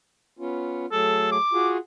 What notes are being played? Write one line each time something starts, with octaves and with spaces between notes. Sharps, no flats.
B3 C#4 F4
F#3 A3 G#4 A4
D6
F4 F#4 G#4